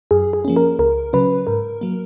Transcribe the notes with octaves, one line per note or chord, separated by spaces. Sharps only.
F#2 G#4
G#4
F3 A#3 C#4
A#4
C#2 A#4
C#3 F#3 C#4 B4
G#2 A#4
F#3 A#3